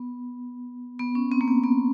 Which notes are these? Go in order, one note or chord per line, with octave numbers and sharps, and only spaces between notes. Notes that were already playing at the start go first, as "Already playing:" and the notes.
Already playing: B3
B3
C#4
C4
A#3
B3
B3